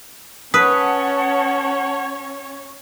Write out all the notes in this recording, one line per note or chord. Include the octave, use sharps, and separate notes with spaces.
C#4 B4 C#5 F#5 A5 D#6